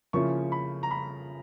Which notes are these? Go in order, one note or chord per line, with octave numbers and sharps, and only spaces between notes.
C#3 F3 A#3 C#4 E4 C#6
B5
A#5
B5